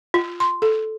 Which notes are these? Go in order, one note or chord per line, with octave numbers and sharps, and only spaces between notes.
F4
C6
A4